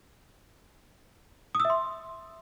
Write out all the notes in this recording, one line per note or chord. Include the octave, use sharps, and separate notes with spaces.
D#6
E6
E5
C6